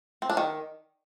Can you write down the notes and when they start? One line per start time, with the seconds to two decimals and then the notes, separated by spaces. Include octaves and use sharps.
0.22 C4
0.30 D4
0.37 D#3